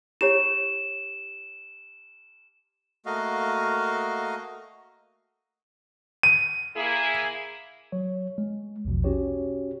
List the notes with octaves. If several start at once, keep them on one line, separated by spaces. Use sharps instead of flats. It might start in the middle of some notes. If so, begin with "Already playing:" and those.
E4 G4 C#5 E7
A3 A#3 F#4 D#5 F5
D#7
A#3 E4 G#4
F#3 C#5
G#3
A#1 E2 B2 F3
C#4 F#4 G4 C#5